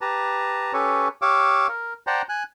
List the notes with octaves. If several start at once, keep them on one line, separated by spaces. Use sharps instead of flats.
G4 B4 A5 A#5
C#4 G4 A4 B4 C#5
G4 C#5 F5 D6 E6
A#4
C5 D5 F#5 G5 A5 A#5
G#5 F#6